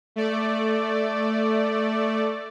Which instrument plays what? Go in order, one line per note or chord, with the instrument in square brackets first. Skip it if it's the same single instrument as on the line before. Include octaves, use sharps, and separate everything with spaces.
[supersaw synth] A3 D5